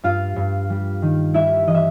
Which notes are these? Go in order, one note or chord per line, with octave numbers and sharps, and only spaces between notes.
G2 F4 F5
G2
G3
D#3
G3 E4 E5
E3 D#5
E5